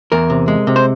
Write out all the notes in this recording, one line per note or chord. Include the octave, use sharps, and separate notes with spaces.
E2 A#4
C3
G#3
C3
C5